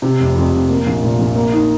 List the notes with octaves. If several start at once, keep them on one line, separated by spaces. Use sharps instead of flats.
C3
F1
F2
F1
A#3
A#1
A#2
A#1
A#3
D#4